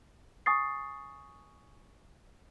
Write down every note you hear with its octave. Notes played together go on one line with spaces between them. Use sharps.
G#5 C#6 D#6 A6 C7